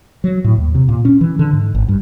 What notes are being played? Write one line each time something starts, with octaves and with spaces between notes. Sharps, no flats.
F#3
A2
D#2
C3
A#2
C#4
E3
D3
G#2
G#1
G2